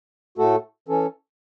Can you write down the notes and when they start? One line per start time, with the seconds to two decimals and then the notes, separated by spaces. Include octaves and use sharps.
0.38 A2 A3 F#4 A4
0.88 E3 C#4 A4